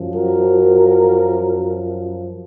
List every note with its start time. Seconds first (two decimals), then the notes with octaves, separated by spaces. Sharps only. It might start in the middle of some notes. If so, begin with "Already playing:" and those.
Already playing: F#2 F3
0.13 F#4 A#4